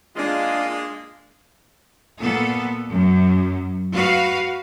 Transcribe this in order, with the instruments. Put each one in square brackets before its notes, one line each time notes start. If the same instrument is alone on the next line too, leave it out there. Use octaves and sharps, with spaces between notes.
[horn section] G#3 A#3 [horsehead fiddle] D4 [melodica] F4
[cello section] A#2 B3 A4
F#2
F#4 B4 F5